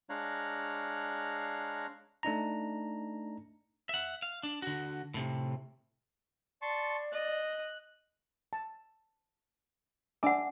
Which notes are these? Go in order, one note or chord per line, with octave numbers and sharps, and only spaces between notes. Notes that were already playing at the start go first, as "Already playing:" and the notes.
G#3 D4 C#5 F5 A#5 F#6
A3 D4 D#4 A#5
E5 F#5
F5
D4
D3 F#4
A2 C3
D5 A5 C6 C#6
D#5 F#6
A5
D4 E5 F#5 G#5 D6